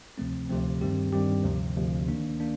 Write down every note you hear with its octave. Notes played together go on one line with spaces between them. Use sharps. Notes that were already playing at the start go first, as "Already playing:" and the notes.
D2 C3 F3 A3 C4
D2 C3 F3 A3 C4
G2 D#3 G3 C4 G4
G2 D#3 G3 C4 G4
D2 C3 F3
D2 C3 F3
D#3 A#3 D4
A#3 D4